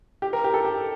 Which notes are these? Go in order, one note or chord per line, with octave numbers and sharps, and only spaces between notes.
G4
A#4
G4
A4
G4